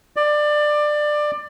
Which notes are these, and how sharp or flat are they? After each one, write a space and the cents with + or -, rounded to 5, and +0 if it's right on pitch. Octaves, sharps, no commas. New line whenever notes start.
D5 +20